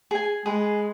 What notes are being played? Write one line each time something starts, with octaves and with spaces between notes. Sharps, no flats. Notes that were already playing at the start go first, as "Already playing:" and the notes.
G#4 G#5
G#3 G#4 B4